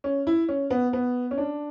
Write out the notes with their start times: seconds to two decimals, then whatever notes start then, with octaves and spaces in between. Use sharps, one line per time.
0.04 C#4
0.27 E4
0.49 C#4
0.70 B3
0.93 B3
1.31 C#4
1.38 D4